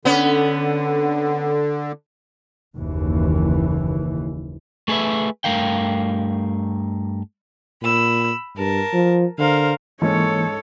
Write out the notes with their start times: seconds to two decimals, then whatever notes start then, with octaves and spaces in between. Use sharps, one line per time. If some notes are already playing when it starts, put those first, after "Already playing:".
0.05 D3 B3 C#4
2.77 F#1 D#2 E3
4.88 A3 G#4 A4 B4 E5
5.44 G2 A3 A#4 F5 G5
7.82 A#2 B5 E6
8.57 G2 A#4 A5
8.93 F3
9.39 D3 A#4 C5 F5
10.02 G#2 E3 A#3 C#4 A4 C#5